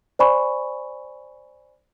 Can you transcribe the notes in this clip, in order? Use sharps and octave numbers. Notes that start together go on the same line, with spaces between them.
C5 D5 G#5 B5 C#6